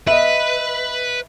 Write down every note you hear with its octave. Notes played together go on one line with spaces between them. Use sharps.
B4 D#5 E5